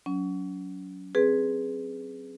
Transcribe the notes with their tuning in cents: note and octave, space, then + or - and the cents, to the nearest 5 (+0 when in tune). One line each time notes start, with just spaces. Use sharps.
F#3 +0 C#4 +30
C4 +0 G#4 +0 B4 +0